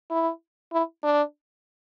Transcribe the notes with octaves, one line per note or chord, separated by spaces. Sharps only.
E4
E4
D4